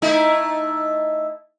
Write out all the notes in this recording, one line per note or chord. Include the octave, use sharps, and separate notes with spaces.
A3 D#4 E4